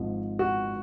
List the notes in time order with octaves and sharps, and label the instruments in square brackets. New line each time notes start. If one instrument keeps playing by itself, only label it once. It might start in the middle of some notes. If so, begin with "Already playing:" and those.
Already playing: [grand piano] G#1 G#2 F3
F#4